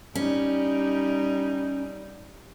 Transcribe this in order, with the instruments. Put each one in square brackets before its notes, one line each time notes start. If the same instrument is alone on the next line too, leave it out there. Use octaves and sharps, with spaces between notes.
[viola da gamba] G3 D#4 [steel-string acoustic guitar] C#4